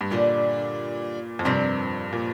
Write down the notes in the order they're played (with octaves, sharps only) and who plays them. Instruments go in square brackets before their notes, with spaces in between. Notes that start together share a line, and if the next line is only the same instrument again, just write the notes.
[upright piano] G2
[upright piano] A#2 [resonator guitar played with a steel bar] D3 G3 D4
[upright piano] F2
[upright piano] G2 [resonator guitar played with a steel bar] C3 F3 C4 A#4 D5
[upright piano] A#2